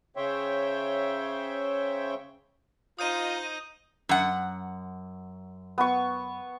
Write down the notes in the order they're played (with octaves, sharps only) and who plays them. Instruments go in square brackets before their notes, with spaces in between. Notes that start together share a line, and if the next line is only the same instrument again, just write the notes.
[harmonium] C#3 C5 C#5 E5 G5
[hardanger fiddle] D#4 D#5 [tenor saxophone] F4 [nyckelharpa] C5 A#5 [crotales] D#6 G6 D#7
[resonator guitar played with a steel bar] F#2 F#5
[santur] B3 C#6